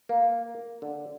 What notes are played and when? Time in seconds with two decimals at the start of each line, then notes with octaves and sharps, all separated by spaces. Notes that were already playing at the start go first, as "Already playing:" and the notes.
0.09 A#3
0.82 D3